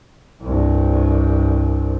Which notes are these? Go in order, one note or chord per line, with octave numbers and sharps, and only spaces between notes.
C2 G2